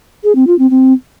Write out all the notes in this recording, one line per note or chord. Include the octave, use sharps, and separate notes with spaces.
G#4
C4
F4
C4
C4